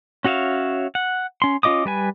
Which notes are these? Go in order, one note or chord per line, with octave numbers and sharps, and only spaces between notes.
C#4 F#4 C#5 E5 F5
F#5
C#4 C6
C#4 F4 D#5 D6 D#6
G3 B4 G#5